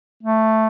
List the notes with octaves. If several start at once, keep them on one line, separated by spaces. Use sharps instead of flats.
A3